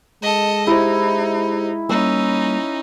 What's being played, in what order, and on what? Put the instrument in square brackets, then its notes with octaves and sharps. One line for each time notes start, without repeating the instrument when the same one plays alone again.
[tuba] G#3 [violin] A4 D#5
[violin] D#4 [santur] E4 [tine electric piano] G4 C5
[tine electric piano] G3 A#3 [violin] C#4 D#4 [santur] E6